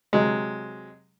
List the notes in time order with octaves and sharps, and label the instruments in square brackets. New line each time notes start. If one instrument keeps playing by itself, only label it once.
[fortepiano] C3 F#3 G#3